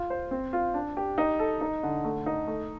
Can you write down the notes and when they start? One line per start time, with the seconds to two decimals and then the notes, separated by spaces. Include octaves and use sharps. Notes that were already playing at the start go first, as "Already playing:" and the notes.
Already playing: F4
0.10 C5
0.31 C4
0.53 F4
0.74 D4
0.97 G4
1.18 D#4
1.39 A4
1.61 D#4
1.83 D3
2.04 A3
2.26 D#4
2.47 A3